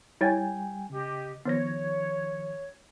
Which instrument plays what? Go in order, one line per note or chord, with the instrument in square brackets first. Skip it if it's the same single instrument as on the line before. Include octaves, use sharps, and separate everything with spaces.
[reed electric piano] G3 G5 G#5 [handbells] E4 C#5 A6
[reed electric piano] C#3 [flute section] G4 D#5
[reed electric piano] D#3 F3 [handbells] B3 C5 A#6 [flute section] C#5